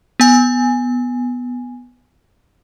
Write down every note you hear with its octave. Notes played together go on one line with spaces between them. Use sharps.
B3 G#5